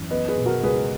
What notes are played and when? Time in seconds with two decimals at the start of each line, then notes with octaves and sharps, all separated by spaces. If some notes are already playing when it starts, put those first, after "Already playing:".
Already playing: F#2 E3
0.11 B3 B4 D#5
0.28 G#4 B4
0.37 B2
0.46 F#4 A#4
0.63 C#2 G#4 B4